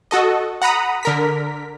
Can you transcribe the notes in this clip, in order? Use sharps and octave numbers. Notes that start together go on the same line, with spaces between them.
F#4 A4 D#5
F#5 A#5 B5 D#6
D3 A#4 B6